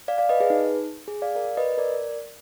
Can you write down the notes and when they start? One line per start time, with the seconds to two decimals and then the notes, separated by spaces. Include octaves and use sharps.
0.08 D5 F5
0.18 D5 F5
0.29 B4 D#5
0.40 G#4 B4
0.50 D#4
1.08 G#4
1.22 D5 F5
1.35 A#4 D5
1.57 B4 D#5
1.78 A#4 D5